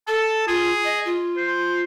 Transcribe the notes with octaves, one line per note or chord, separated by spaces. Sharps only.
A4 A5
F4 G#4
D#5
F4
C5